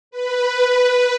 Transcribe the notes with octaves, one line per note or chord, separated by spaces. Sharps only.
B4